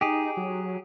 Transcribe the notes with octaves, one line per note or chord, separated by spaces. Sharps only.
D#4 G4 G#4
F#3